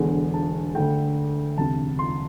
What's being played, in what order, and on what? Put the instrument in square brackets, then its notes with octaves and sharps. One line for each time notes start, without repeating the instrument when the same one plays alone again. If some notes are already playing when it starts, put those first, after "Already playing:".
Already playing: [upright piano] E1 E2 D3
A5
D2 D3 A3 G5
E1 D2 C3 A5
C6